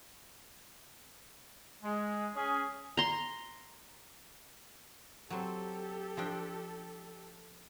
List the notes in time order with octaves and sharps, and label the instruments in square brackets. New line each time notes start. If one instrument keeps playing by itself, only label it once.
[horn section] G#3
C#4 G#4
[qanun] A#5 C6
[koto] F#3 C4 [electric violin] G4 A4
[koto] F3 D4 G5